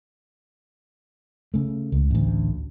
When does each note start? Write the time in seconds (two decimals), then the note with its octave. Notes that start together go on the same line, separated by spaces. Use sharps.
1.54 C#3 A3
1.92 C#2
2.11 A1 D2